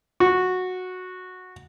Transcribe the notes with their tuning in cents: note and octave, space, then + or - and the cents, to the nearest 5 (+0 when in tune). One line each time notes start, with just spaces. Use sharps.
F#4 -10